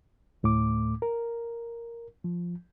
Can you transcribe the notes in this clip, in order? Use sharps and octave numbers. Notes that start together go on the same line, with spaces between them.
D2 A2 A3 D6
A#4
F3